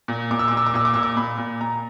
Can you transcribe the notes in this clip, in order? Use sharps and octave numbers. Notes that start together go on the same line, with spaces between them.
A#2
A#2 D6
E6
A#2 D6
E6
D6
A#2 E6
D6
A#2 E6
D6
A#2 B5
A#2
A#2 A#5